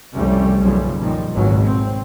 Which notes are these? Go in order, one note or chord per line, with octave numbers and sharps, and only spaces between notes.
C2 F2 C3 G3 A3 C#4
F#1 B1 C#3 F3 G3
A#2 D#3 F3 G3
G#1 C#2 B2 F#3
C4